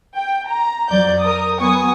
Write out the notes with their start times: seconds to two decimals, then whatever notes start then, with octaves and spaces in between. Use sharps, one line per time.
0.15 G5
0.49 A#5
0.89 F2 F#3 D5 G6
1.23 A#4 D#6
1.60 F#3 B3 G#5 C#6 D#6